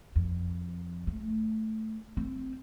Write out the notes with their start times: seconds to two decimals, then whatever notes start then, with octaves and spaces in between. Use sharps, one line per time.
0.16 F2
1.07 A3
2.17 C4